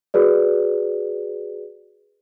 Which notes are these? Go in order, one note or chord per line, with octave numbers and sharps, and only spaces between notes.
F#4 G#4 B4 D5